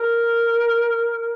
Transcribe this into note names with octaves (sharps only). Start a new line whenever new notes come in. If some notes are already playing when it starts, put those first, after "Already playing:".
Already playing: A#4